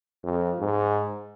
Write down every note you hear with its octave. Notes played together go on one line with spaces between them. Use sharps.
F2
G#2